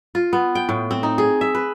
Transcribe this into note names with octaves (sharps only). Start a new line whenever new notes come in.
F4
B3
G5
A2
C4
D#4
G#4
E5
B4